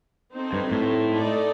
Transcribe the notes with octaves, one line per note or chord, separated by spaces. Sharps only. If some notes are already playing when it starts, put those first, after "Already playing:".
C4 D#4 A4 C5
G2
A2
A3 D#4 A4 D5